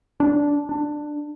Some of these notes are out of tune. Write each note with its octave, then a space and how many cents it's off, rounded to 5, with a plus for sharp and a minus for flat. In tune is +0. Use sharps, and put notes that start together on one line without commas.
D4 -10
D4 +15